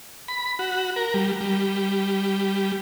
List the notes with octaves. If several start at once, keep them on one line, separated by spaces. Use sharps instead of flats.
B5
F#4
A#4
G3
G3